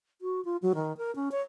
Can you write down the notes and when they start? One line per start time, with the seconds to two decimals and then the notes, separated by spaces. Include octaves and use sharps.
0.22 F#4
0.45 F4
0.62 F#3
0.75 D#3
0.97 A#4
1.16 C#4
1.32 C#5